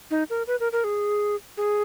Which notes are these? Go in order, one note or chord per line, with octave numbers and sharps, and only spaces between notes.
D#4
A#4
B4
A#4
A#4
G#4
G#4